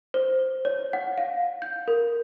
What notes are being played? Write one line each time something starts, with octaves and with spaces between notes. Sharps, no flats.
C5
C#5
F#5
F5
G6
A#4